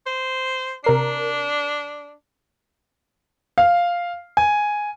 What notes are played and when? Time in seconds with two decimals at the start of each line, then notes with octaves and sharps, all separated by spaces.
0.06 C5
0.84 C3 D4 A#4 C7
3.58 F5
4.37 G#5